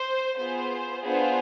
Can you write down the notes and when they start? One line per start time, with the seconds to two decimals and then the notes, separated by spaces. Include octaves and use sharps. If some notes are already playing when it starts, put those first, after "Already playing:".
Already playing: C5
0.37 B3 F4 G#4 C5
1.05 B3 D4 F4 G#4 C5